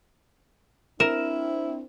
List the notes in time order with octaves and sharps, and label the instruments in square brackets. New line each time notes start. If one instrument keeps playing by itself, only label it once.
[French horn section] C4 D4 [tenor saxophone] E4 [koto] A#4 [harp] E7